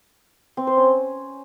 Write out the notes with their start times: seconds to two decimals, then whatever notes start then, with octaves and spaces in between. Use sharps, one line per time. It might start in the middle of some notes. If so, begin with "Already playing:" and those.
0.57 C4
0.67 C5
0.77 C#4